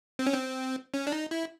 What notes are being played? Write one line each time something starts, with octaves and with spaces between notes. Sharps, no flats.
C4
C#4
C4
C#4
D4
D#4
E4